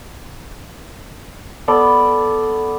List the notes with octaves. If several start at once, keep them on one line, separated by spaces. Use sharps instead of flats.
B3 A4 D5